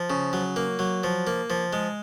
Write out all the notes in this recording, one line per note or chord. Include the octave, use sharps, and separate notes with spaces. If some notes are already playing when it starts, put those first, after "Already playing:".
Already playing: F3
C#3
F#3
A#3
F#3
F3
A#3
F3
G#3